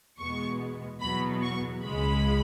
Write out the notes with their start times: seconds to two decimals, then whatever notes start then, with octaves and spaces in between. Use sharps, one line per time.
0.19 E2 B2 G#3 B3 C#6
1.01 E2 B2 F#3 B3 B5
1.43 C#6
1.83 C#2 C#3 G#3 B5